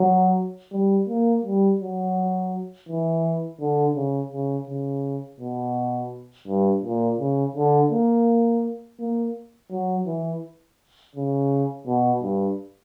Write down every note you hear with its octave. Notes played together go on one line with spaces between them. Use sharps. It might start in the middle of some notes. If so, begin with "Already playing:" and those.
Already playing: F#3
G3
A#3
G3
F#3
E3
D3
C#3
C#3
C#3
B2
G2
A#2
C#3
D3
A#3
A#3
F#3
E3
C#3
B2
G2